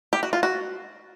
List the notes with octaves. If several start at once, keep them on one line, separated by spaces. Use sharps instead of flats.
G4
F#4
F4
F#4